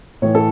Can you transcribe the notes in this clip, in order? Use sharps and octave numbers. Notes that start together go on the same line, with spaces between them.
A2 E3 C#5
A4